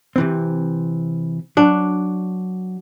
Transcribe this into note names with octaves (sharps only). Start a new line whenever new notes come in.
C3 E3 C4
F#3 D4